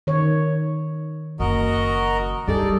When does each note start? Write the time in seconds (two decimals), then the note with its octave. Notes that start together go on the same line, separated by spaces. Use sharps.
0.07 D#3 C#5
1.40 F#1 F#4 A#4 D#5
2.48 G2 G3 D#4 G#4 A4 D5